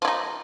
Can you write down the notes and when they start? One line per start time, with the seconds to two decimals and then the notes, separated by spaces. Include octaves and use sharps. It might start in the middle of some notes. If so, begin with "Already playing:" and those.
0.02 F3
0.05 E4
0.08 D#4